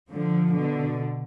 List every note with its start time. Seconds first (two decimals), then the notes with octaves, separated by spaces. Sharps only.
0.11 D3 F3
0.55 B2 D3